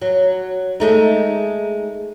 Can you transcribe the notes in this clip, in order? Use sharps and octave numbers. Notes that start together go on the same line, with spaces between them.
F#3
G#3 A3 D#4